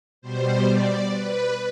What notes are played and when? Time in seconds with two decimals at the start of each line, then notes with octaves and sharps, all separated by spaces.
0.22 B2 G3 C5
0.66 D5
1.11 B4